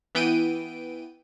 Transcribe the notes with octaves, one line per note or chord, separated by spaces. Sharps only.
E3 B3 G5 D7 D#7